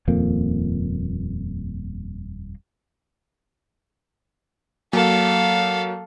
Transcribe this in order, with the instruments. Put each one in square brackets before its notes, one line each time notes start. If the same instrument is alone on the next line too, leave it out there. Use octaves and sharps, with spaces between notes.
[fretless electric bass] D#1 F2 A#3
[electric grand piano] F#3 A#3 [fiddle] A4 F5